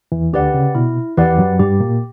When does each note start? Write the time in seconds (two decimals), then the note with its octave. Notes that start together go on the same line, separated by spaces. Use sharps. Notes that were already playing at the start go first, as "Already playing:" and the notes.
0.12 E2 E3
0.33 D2 D3 G4 B4 D5 F#5
0.54 C#3
0.75 B2 E4
1.17 E2 E3 G4 B4 D5 F#5
1.38 F#2 F#3
1.59 G2 G3 G4
1.80 A#2 A#3